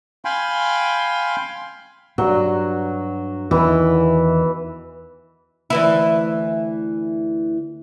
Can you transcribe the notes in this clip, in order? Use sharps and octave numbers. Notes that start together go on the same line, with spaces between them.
F5 G5 G#5 B5 C6
G2 F#3
E2 D#3 E3
D2 E3 E4